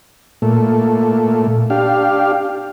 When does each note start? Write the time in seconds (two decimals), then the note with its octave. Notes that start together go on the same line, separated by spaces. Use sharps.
0.42 A#2 A3
1.70 D4 G4 F5